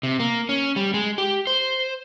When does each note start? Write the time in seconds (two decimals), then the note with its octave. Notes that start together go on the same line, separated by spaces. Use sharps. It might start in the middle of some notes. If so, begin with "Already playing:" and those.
0.03 C3
0.19 A#3
0.49 C#4
0.76 G3
0.94 G#3
1.18 G4
1.47 C5